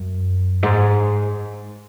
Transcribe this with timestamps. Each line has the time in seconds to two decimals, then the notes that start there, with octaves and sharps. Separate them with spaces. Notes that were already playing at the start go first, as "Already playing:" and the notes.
Already playing: F#2
0.63 G#2